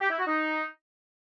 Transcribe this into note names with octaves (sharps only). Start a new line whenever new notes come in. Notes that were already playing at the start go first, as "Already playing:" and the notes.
G4
E4
F#4
D#4